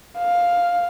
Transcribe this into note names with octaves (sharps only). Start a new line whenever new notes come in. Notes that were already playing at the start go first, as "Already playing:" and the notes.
F5